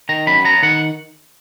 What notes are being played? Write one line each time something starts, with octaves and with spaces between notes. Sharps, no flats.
D#3 A#5
F#2 B5
B3 A#5
D#3 F#5